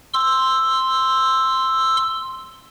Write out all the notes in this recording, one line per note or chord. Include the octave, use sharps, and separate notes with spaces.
C6 E6